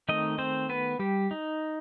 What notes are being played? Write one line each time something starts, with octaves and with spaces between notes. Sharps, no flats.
D#3 A3 C4 D#4 D#5
C4 C5
B3 B4
G3 G4
D#4